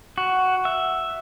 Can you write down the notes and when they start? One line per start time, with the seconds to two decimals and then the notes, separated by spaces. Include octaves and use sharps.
0.18 F#4
0.65 E5